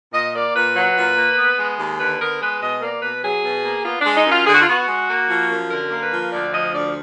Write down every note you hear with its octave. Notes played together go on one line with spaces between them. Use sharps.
A#2 D#5
A#3 D5
A#2 B4
F#3
A#2
A#3
B3
G#3
D#2
D3 B4
B3 A#4
G#3 B4
B2 D#5
A#3 D5
B2 B4
F#3 G#4
B2
A#3
B3 F4
G#3 D4
D#4
F#2
F4
D3 G#4
F#4
F4
B3 F#4
G#3
A#3
F3
F#2
D3 A#4
A#3
B4
F3
D2 D5
F3 D#5
D2 D5